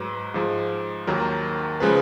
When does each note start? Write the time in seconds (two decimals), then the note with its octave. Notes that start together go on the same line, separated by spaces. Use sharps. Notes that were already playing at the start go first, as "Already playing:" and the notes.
Already playing: G#2 F#3 B4
0.34 G#2 F3 G#3
1.07 D#2 D#3 F#3 A#4
1.80 C#3 F3 G#3 B4